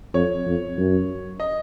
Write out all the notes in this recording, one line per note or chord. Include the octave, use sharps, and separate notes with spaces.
F2 C#5
F2
F#2
D#5